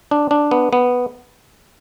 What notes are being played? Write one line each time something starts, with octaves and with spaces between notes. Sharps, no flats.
D4
D4
B3
B3